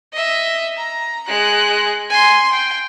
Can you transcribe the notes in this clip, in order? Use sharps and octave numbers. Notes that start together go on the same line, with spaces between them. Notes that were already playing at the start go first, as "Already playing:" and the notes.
D#5 E5
A#5
G#3 F#6
G#5 C6
G5